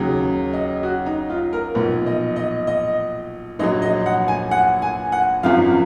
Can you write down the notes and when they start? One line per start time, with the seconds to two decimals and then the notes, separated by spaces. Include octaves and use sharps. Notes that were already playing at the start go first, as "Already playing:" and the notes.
Already playing: D#2 C#3 F#3
0.53 D#5
0.83 F#4
1.06 D#4
1.30 F4
1.53 A#4
1.75 B1 A#2 F3
2.06 D#5
2.36 D#5
2.67 D#5
3.59 A#1 A#2 F#3 D#5
3.82 D#5
4.06 F#5
4.28 G#5
4.51 F#5
4.82 G#5
5.12 F#5
5.43 G#1 F#2 F3 F5